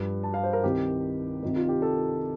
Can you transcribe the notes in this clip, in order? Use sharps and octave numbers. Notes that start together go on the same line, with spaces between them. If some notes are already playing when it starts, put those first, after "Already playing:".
Already playing: G2 F3
A5
F5
C5
A#4
C2 C3 D#3 G4
C2 C3 D#3
F4
G4
A4